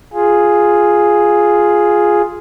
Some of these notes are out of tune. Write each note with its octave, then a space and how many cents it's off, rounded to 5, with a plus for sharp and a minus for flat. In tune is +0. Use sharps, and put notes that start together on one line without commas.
F4 +0 G#4 +0